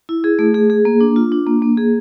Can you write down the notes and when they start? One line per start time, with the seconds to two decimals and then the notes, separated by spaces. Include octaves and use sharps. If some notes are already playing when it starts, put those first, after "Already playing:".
0.09 E4
0.24 G#4
0.39 A3
0.54 G#4
0.70 G#4
0.85 A#3
1.01 D4
1.16 F4
1.32 D4
1.47 A#3
1.62 A#3
1.77 G#4